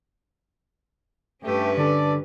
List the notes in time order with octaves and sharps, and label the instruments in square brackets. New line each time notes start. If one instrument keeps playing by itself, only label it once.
[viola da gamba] G2 C#4 B4 [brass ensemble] A3 G4
[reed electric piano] D3 D4 [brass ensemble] A4 D5